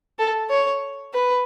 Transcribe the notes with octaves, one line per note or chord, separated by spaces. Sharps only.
A4
C#5
B4